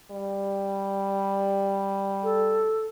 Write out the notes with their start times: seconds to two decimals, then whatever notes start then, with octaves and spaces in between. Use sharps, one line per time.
0.11 G3
2.23 A4